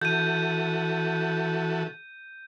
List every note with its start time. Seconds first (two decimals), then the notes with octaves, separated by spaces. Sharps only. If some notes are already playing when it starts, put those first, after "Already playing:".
0.02 E3 F#4 A4 G6 D#7